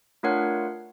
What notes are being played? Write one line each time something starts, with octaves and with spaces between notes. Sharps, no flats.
A3 D4 F4 A#4 C#5 F#5